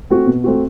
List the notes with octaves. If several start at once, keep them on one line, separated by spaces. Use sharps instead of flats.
A3 C4 F#4
B2
A3 C4 F#4